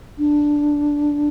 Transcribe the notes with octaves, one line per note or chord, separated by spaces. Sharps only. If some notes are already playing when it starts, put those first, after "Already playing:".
D4